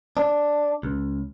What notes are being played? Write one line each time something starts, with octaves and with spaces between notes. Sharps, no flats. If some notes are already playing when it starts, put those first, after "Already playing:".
D4
C#2